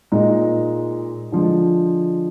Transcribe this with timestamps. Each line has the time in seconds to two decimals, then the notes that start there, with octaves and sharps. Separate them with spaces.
0.12 A#2 G#3 D#4
1.32 D3 F3 G#3